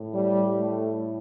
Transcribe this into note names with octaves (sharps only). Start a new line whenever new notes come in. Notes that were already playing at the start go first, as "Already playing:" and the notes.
Already playing: A2
G3
A3